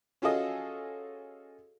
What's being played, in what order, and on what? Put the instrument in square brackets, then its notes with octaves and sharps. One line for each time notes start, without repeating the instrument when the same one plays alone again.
[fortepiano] C#4 F4 F#4 G#4 A4 D#5